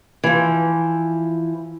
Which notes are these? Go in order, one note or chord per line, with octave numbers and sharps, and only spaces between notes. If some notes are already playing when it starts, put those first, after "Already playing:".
E3 F3